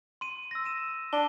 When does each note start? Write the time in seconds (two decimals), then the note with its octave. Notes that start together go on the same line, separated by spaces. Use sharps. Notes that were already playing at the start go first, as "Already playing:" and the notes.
0.21 C6 D#7
0.51 E6 A#6
0.64 E6 D#7 E7
1.13 D4 G7